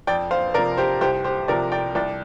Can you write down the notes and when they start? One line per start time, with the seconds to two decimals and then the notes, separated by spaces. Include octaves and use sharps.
0.07 F2 D5 G5
0.31 C5 F5
0.54 C3 A#4 D5
0.58 F3
0.78 G4 C5
1.01 C2 G4 C5
1.24 G4 C5
1.48 C3 F3 A#4 D5
1.72 D5 G5
1.95 C2 D5 G5